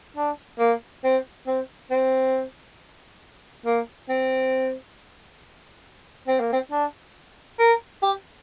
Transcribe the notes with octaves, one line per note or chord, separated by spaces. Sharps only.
D4
A#3
C4
C4
C4
A#3
C4
C4
A#3
C4
D4
A#4
G4